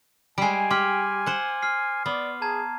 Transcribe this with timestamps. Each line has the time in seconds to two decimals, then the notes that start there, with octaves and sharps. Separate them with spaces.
0.38 G3 G#3 G#5 C7 D7
0.71 G4 C6 D6 F6
1.26 C5 F#5
1.62 F6 C7
2.06 B3 D5
2.42 G#4 A5 A#5 G#6